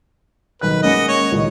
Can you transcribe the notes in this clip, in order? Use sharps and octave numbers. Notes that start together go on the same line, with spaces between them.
B1 D#3 B4 F#6
G#3 A#3 C#4 F#4 D#5
C#5
C#2 A#2 D#3